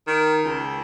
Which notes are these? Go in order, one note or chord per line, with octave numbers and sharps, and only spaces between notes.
D#3
C#2